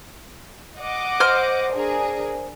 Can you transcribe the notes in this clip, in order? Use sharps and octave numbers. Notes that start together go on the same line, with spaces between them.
D#5 F#5 D6
C5 F6
D4 G#4 A#4